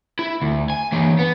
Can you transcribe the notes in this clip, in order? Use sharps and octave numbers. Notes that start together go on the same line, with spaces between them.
E4
D2
G#5
E3 A#3
B3